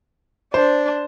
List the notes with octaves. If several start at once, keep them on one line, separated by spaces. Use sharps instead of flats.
D4 C5